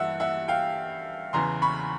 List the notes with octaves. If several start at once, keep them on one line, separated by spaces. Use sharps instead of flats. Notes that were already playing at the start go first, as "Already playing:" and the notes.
Already playing: G2 E3 E5 F#5
E5 F#5
F5 G5
E2 C#3 E3 A#5 C6
B5 C#6